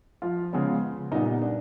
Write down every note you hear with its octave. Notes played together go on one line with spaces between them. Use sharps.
F3 F4
C#3 F3 G#3 B3
A#2 G3 B3 D#4
D4